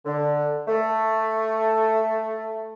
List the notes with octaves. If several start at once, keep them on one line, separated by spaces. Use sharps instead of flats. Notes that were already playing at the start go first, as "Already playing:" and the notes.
D3
A3